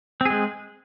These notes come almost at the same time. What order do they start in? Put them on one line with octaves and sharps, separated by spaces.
C4 G#4 G#3